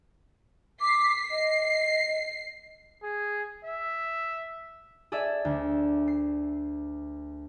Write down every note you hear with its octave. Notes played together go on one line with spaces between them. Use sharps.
D6 B6 C7
D#5 C7
G#4
E5
G#4 A4 D5 E5
D2
C7